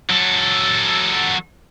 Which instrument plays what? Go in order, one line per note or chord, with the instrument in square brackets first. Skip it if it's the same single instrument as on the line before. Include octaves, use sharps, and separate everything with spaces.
[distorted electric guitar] F#3 A4